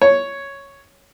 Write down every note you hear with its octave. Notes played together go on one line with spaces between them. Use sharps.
C#5